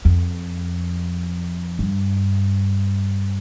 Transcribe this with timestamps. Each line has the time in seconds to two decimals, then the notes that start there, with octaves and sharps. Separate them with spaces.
0.05 F2
1.79 G2